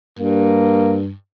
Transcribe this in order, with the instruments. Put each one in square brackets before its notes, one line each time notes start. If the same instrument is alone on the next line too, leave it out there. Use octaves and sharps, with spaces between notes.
[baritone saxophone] G2 [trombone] A#3